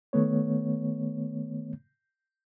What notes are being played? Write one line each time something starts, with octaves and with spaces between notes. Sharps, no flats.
D#3 A3 B3 C#5